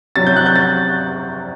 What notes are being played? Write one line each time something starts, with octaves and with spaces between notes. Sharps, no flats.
C3 F#3 A6
G6
F#6
G6
A6